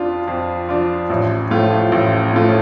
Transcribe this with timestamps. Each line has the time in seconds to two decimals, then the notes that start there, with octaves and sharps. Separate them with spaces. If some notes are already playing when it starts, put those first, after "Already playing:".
Already playing: F2 F3 D4 F4
0.28 F2
0.69 F3 D4 F4
1.10 A1
1.51 A2 F3 A3 F4
1.92 A1
2.33 A2 F3 A3 F4